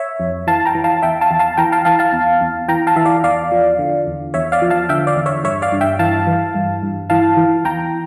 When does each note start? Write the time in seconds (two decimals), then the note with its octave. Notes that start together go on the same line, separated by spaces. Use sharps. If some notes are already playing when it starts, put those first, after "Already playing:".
Already playing: C#5 E5
0.20 F2
0.47 E3 F5 A5
0.65 G5 A#5
0.75 E3
0.84 F5 A5
1.02 E2 E5 G5
1.21 F5 A5
1.31 E2
1.39 F5 A5
1.57 E3 G5 A#5
1.72 F5 A5
1.85 E3 F5 A5
1.99 F5 A5
2.13 E2
2.41 E2
2.68 E3 G5 A#5
2.87 F5 A5
2.96 E3 E5
3.05 D5 F5
3.24 E2 D5 F5
3.52 F3
3.79 D3
4.07 E2
4.34 E2 C#5 E5
4.52 D5 F5
4.62 F3
4.70 F5 A5
4.89 D3 E5 G5
5.07 D5 F5
5.16 E2
5.26 C#5 E5
5.44 G2 C#5 E5
5.62 D5 F5
5.72 G2
5.81 E5 G5
5.99 E3 F5 A5
6.27 E3
6.55 G2
6.83 G2
7.10 E3 F5 A5
7.37 E3
7.65 E2 G5 A#5